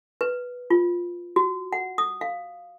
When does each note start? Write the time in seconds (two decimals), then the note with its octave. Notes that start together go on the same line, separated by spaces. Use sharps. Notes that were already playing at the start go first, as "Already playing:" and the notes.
0.21 B4
0.70 F4
1.36 F#4
1.73 F#5
1.98 D#6
2.21 F5